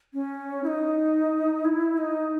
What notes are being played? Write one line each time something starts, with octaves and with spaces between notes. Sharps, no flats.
C#4
E4
D#4
E4
D#4